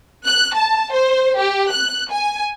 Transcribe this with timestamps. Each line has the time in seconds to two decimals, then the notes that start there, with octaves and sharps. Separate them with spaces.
0.24 F#6
0.54 A5
0.91 C5
1.37 G4
1.71 F#6
2.11 G#5